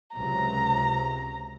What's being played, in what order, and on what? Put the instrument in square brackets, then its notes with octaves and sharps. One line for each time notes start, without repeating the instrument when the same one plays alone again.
[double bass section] C#2 C3 F#3 [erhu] A#5